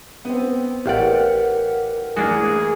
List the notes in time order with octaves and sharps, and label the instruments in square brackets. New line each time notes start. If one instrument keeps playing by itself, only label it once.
[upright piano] B3 C4
[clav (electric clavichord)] A1 D5 [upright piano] G4 F5 F#5 [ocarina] A#4
[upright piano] A1 [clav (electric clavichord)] A#3 D4 F#4 [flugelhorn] G#4